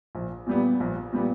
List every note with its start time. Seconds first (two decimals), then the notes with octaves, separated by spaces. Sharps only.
0.15 A#1
0.47 A#2 G3 B3
0.80 A#1
1.13 A#2 G3 B3